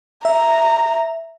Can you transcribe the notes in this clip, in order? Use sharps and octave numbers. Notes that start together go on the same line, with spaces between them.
E5 A#5